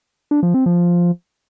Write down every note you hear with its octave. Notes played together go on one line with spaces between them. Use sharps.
D4
F3
C4
F3